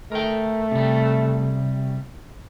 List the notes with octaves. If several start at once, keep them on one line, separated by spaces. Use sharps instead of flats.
A3 A#4 G5
C3 G3